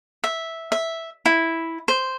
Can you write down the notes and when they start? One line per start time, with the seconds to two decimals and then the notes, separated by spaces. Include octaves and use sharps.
0.24 E5
0.72 E5
1.26 E4
1.88 C5